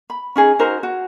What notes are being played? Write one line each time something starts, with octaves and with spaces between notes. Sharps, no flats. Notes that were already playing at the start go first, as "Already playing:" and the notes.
B5
C#4 D#4 G#4
D#4 F#4 A#4 C5
F#4